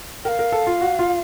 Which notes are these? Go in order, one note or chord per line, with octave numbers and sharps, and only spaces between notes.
A#4 F5 G5
A#4
A4
F4
F#4
F4